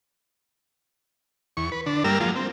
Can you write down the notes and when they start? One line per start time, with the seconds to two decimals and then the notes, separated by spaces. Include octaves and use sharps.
1.57 E2 C#6
1.72 B4
1.86 D3 D4
2.04 G2 G3 A#3 A#4 E6 F6
2.20 F3 F#3 G#3 A#3 F4
2.36 C4